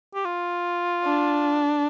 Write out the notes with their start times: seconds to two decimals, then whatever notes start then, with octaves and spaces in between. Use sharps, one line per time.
0.15 G4
0.25 F4
1.04 D4